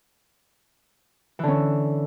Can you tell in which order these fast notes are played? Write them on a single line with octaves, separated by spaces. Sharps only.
E3 D3 C#4